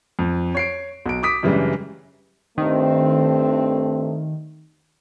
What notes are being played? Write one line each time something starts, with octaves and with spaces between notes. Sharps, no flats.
F2
C#5 C7 D7
B1 D7
D6 D#6 B6 D7
F#2 C#3 E3 G3 G#3 D4
G2 D#3 A3 C4